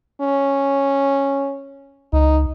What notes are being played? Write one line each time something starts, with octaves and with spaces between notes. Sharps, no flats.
C#4
C#2 D#4